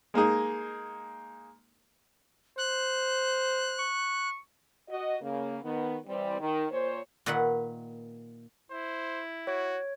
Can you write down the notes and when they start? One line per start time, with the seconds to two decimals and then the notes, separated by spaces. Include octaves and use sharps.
0.14 G#3 A#3 D#4 G#4
2.58 C5 F#6
3.79 C#6
4.89 F#4 D#5
5.22 C#3 A#3
5.63 D#3 B3
6.06 E3 G3 C4
6.39 D#3
6.71 A#2 C5 C#5
7.26 A#2 D#3 B4 E5 F#5
8.71 E4 C5
9.47 F#4 C#5